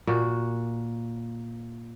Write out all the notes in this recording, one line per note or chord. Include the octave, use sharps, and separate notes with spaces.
A#2 F#4